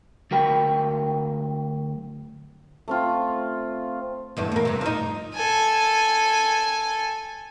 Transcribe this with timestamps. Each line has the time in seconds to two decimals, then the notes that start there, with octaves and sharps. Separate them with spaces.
0.31 D2 F#3 A#4 G5 B5
2.88 A3 C4 F4
4.37 E2 G2 A3
4.52 E2 A#3
4.65 G2 C3
4.81 F3 D#4
5.34 A4 G#5